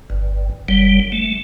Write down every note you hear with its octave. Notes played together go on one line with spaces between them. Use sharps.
G1
F#1 G3
A3